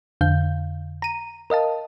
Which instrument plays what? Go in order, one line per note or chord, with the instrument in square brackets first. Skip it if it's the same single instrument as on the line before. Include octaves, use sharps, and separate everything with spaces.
[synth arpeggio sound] F2 D3 F5 G6
A#5 D#7
A#4 D#5 F5 A5